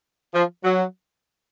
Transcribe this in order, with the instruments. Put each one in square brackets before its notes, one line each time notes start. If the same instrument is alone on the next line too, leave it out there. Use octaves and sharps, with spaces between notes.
[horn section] F3
F#3